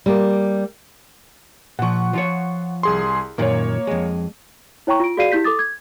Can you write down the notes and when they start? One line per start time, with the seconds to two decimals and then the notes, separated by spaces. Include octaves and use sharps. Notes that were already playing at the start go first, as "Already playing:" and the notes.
0.06 G3 A#3
1.79 A#2 F3 F#5 C#6
2.13 F3 F4 C#5
2.83 C2 G#4 C6
3.38 F#2 A#2 D#3 A#3 C#5
3.87 F2 G#3
4.87 E4 C#5 G5 A#5 C#6
5.00 F4 D7
5.17 F#4 G#4 D5 F5 C7 D#7
5.32 E4 G4 G6 B6
5.44 A4 D6 D#6 A6
5.59 G#6